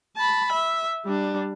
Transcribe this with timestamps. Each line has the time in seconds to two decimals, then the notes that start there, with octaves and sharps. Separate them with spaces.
0.17 A5 B5
0.52 E5
1.06 G3 D4